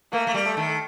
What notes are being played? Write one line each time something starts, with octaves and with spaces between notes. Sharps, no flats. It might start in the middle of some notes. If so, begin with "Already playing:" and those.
A3 A#3
A3
G3
A3
D#3